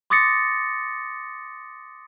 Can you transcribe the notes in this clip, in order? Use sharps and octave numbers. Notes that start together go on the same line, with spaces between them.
C6 D6 D#6 A6 A#6 C#7